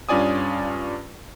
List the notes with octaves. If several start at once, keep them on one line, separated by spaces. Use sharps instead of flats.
G2 C#4 F4 D5 G#5 D#6